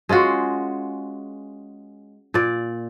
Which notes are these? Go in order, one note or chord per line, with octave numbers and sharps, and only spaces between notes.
G#3 C#4 F4 F#4
A#2 D5